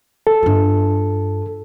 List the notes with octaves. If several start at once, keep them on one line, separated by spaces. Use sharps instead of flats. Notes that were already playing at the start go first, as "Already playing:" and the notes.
A4
G2 F4